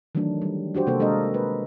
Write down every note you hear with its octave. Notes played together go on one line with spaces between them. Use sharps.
D#3 E3 F#3 A3 D4
G3
D4 F#4 G4 C5
C3 A#3 A4 C5
G#3 D4 A4 A#4 D#5
B4